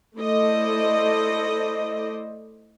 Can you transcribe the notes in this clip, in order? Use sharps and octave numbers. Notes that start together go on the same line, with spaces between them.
A3 E4 A4 C5 D5 D#5